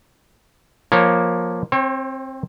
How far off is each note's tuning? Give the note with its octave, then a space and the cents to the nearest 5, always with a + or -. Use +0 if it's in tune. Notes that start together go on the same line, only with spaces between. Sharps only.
F3 +10 A#3 +10 C#5 +0
C4 +15 C#5 -40